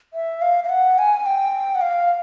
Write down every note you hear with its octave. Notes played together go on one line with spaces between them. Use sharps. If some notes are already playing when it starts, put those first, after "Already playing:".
E5
F5
F5
F#5
G#5
G5
F#5
F5